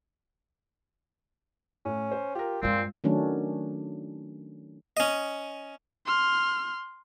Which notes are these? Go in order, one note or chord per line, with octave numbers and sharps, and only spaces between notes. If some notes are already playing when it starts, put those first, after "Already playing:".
A2 C#4
C5
F4 G4 A#4
G2 A#2 G#3 C4 F4
D#3 F#3 A3 C#4 D4
C#4 D#5
C6 F6